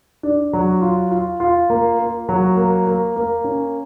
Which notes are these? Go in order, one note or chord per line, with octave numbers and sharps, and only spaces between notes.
D4
F#3
F4
F4
F4
A#3
A#3
F#3
A#3
A#3
A#3
C#4